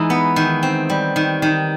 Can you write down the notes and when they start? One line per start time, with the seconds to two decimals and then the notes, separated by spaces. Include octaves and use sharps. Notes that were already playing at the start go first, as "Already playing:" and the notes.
Already playing: E3 G#3 D#4
0.10 B3
0.36 D#3
0.63 C4
0.90 G3
1.16 D#3
1.42 D#3